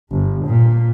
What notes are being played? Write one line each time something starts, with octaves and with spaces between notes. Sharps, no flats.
G1
A#2